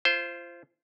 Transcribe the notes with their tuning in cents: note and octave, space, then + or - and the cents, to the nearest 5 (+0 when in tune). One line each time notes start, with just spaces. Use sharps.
F4 -30 C5 +0